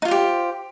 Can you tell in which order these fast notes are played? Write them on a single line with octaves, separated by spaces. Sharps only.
D#4 F4 C5 G4